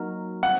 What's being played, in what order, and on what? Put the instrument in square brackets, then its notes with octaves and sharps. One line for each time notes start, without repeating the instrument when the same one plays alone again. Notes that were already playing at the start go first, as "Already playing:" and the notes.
Already playing: [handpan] F#3 A#3 D#4 F#4 A#4
[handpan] G3 C4 [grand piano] F#5